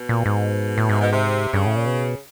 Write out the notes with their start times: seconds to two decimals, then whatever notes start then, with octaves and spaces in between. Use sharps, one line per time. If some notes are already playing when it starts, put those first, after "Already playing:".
Already playing: B2
0.09 A#2
0.26 G#2
0.78 A2
0.89 G#2 C3
1.02 B2
1.13 C3
1.54 G2 C#3
1.66 A2
1.76 A#2
1.86 B2